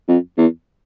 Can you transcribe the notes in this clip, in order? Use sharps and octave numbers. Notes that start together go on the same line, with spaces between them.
F2
E2